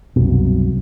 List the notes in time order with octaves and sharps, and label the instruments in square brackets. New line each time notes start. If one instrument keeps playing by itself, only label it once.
[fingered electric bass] C2 F#2 B2